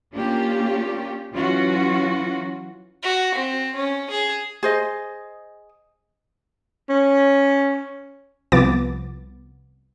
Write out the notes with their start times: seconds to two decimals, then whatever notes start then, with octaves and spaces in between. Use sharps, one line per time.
0.13 A#3 C#4 D4 F4 G4
1.32 E3 F#3 C#4 F4 F#4
3.03 F#4
3.35 C4
3.75 C#4
4.10 G#4
4.63 G#4 C5 D#5
6.89 C#4
8.52 C2 F3 B3 D6 A6